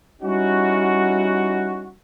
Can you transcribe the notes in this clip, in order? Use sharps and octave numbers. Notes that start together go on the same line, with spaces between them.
G3 C#4 D#4 E4 F#4